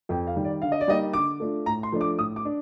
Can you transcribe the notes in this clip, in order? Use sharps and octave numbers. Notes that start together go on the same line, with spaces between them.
F2 G5
F5
D#3 G3
D5
D3 F5
D#5
D5
G3 A#3 D#4 D#5
D3 D6
A3 D4 F4
A2 A#5
C6
F3 A3 D4
D6
A2 D#6
D6
D4